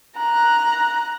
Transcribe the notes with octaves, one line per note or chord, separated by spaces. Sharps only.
A#5 F#6